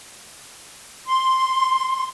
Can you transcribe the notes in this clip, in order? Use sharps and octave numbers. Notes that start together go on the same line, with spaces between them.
C6